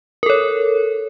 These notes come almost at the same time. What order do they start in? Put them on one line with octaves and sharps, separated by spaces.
A#4 A4 C#5